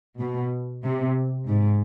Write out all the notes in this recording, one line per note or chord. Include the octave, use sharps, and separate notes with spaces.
B2
C3
G#2